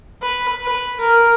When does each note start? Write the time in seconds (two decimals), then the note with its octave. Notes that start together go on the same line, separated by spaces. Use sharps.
0.22 B4
0.63 B4
1.00 A#4